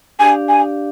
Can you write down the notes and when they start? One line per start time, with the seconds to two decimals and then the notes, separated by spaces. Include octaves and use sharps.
0.19 D4 G4 D5 F5 G#5
0.49 G#5